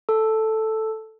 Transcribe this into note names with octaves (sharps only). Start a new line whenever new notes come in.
A4